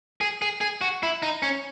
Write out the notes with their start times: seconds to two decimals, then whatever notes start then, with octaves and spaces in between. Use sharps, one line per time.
0.21 G#4
0.42 G#4
0.61 G#4
0.81 F#4
1.03 E4
1.23 D#4
1.43 C#4